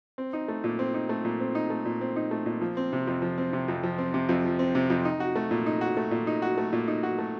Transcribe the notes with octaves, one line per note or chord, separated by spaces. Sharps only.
C4
D#4
A3
A#2
C4
D#4
A3
A#2
C4
D#4
A3
A#2
C4
D#4
A3
A#2
F3
C4
C3
F2
F3
C4
C3
F2
F3
C4
C3
F2
F3
C4
C3
F2
D#4
F#4
A3
A#2
D#4
F#4
A3
A#2
D#4
F#4
A3
A#2
D#4
F#4
A3